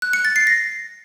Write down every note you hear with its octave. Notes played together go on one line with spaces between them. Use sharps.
F#6
C#7
A6
C7
A#6